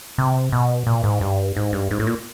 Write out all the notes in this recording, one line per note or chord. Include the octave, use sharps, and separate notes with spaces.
C3
B2
A#2
G#2
G2
G#2
G2
G#2
A2
A#2